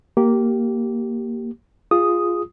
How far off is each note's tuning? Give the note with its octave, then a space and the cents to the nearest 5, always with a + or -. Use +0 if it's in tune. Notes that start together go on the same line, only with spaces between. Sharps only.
A#3 +0 G4 -15
F4 +0 G#4 -10 D#6 +0